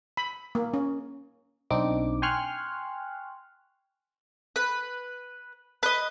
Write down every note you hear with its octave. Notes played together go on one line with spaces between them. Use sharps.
B5
A#3
C#4
B1 C4 D4 D#4 D6
G5 G#5 C6 C#6 F6 F#6
B4
B4 D#5